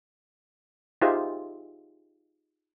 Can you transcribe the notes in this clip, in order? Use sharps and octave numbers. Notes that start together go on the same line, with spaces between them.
D#4 F4 G4 G#4 C5 E5